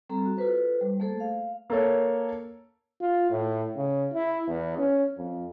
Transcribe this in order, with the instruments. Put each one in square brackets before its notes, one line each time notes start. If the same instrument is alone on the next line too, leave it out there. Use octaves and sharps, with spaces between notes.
[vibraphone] G3 C4 A4 A#5
F#4
F4 A4 B4 C5
G3
A3 A#3 G#4 A4 C5
F5
[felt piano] A#3 A4 C#5
[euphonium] F4
A2
C#3
E4
E2
C#4
F2